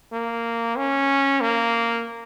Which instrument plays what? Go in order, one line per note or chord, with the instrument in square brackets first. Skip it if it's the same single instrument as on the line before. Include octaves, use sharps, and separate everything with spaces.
[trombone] A#3
C#4
A#3